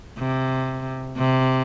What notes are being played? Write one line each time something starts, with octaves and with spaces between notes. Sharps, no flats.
C3
C3